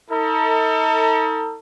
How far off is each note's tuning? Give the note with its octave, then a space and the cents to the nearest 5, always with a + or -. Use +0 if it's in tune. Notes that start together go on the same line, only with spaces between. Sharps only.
D#4 +45 A4 +35